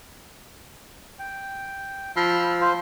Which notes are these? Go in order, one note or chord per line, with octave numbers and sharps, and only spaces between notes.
G5
F3 B5 E6 F6
F4 C5